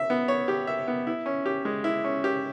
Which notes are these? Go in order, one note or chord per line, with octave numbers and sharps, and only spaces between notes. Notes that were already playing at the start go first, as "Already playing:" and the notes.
Already playing: E5
B3
C#5
G4
E5
B3
E4
C#4
G4
G#3
E4
C#4
G4